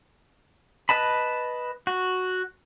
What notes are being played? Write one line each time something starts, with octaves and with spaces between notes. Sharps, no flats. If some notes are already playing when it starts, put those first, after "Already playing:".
B4 D#5 A5 B5
F#4